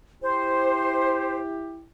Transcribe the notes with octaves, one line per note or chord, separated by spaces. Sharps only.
E4 G4 C5